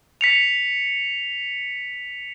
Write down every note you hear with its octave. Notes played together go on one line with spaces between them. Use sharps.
B6 C#7 F7